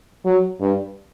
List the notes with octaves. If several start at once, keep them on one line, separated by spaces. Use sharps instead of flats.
F#3
G2